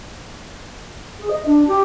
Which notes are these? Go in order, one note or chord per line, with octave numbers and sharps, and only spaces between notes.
G#4
D#5
D4
G4